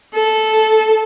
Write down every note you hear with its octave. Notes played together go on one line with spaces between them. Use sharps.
A4